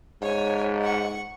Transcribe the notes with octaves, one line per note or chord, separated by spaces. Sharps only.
G#2 C#5 G#5
F#5 C#6